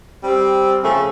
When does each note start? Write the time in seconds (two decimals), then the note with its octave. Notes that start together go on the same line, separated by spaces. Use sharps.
0.24 G3 C4
0.84 C#3 F3 A3